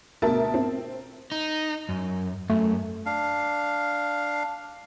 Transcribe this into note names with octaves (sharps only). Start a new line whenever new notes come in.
D2 B2 A#4 E5 A5 A6
C4
D#4
F#2
F#2 A3
D4 F5